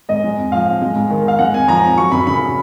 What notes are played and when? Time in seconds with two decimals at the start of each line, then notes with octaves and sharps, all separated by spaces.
0.09 G#2 D#5
0.24 G#3
0.37 F2
0.52 F3 F5
0.67 F2
0.82 G#3
0.96 G#2
1.10 D#3
1.25 G#2 F5
1.39 G#3 F#5
1.54 F2 G#5
1.68 F3 A#5
1.83 F2
1.97 F#3 C#6
2.12 F#2 B5
2.27 C#3 B5